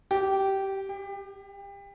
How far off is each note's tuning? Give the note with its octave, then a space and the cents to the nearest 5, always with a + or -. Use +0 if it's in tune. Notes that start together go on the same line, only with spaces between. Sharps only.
G4 -15
G4 +30